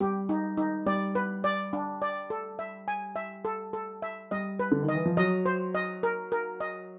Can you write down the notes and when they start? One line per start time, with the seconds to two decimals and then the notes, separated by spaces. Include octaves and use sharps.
0.01 G3 G4
0.29 D#4
0.57 D#4
0.86 G3 D5
1.15 B4
1.44 D5
1.73 D4
2.02 D5
2.30 A4
2.59 E5
2.88 G#5
3.16 E5
3.45 A4
3.73 A4
4.02 E5
4.31 G3 D#5
4.59 B4
4.72 D3
4.83 D#3
4.89 D#5
4.95 E3
5.06 F3
5.17 F#3 D#5
5.46 C5
5.75 D#5
6.03 A#4
6.32 A#4
6.60 D#5